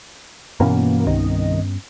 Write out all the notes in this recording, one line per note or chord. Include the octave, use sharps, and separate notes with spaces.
G2 B2 E3 A#3 B3 C#4
C2 D#3 D#5